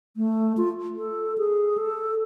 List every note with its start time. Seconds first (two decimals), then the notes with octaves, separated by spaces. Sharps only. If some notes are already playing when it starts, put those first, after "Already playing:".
0.17 A3
0.57 F4
0.97 A4
1.38 G#4
1.78 A4